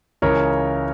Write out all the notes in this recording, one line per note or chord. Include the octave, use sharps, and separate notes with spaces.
C#2 C#3 E3 A#4 C#5